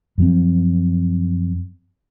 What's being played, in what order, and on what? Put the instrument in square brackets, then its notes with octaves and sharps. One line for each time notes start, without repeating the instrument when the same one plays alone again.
[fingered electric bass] F#2 F3 C4